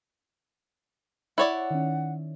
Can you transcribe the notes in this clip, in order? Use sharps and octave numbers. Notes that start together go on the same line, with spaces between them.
E4 C#5 D5 F#5 C#6
D#3 C#4